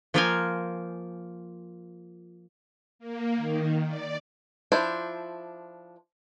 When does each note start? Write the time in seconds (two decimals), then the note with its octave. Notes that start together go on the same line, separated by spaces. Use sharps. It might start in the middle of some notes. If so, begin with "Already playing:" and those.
0.14 F3 A#3 F4 A#4 C5 G#5
2.99 A#3
3.36 D#3
3.86 D5
4.72 F3 D4 E4 C5